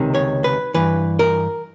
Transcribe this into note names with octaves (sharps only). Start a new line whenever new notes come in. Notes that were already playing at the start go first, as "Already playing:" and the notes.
Already playing: C#2 C3 D#3
C#5
B4
G2 E3 B4
A#4